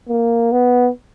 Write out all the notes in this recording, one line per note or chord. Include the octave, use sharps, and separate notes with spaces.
A#3
B3